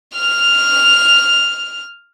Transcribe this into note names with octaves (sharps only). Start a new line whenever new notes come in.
F6 F7